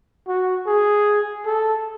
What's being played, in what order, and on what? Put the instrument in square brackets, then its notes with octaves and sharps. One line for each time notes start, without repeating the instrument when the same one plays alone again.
[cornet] F#4
G#4
A4